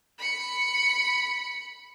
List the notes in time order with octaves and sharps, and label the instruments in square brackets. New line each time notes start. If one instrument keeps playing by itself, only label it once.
[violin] B5 C#7